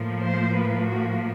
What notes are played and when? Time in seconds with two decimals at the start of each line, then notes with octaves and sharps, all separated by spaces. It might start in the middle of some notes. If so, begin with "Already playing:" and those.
Already playing: A2 F3 A#3
0.24 C5
0.54 B4
0.85 F#4